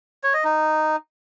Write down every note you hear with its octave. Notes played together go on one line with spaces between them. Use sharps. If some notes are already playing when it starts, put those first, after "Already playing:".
C#5
D#5
D#4